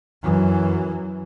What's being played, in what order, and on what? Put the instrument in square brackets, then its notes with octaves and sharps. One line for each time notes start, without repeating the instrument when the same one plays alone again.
[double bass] F#2 E3